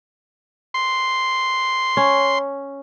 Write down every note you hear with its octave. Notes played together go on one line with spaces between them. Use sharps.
C6
C#4